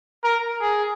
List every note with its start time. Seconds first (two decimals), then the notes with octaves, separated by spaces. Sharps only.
0.24 A#4
0.61 G#4